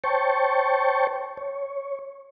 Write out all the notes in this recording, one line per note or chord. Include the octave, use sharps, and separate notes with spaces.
C5 C#5 G5 A5 C#6
C#5